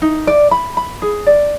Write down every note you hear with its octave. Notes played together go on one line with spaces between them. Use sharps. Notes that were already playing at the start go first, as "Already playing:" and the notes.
D#4
D5
B5
B5
G#4
D5